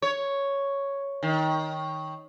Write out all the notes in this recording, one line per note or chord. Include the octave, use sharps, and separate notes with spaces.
C#5
D#3